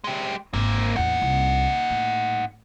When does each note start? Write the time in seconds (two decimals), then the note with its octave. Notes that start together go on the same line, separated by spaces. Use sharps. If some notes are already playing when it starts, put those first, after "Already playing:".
0.04 G#3 G4
0.53 G#1 A#3 C4
0.96 A1 E2 D#4 F#5
1.22 C2
1.90 A2